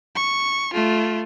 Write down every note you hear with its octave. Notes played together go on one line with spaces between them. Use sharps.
C#6
A3 F4